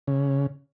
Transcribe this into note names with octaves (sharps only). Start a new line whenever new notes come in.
C#3